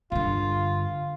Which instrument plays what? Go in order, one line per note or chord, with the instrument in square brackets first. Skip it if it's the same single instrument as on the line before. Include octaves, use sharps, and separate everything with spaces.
[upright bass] G2 D3 [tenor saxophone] F4